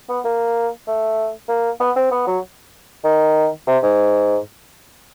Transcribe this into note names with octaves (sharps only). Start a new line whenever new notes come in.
B3
A#3
A3
A#3
B3
C4
B3
F#3
D#3
C3
G#2